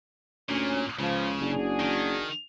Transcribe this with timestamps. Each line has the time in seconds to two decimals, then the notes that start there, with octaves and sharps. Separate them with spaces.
0.49 D2 A#2 C#4
0.99 C#2 C#3 F3
1.41 F#1 D4 F#4 G#4
1.79 D#3